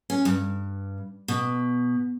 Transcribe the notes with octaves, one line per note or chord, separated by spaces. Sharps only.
C#4
G2
B2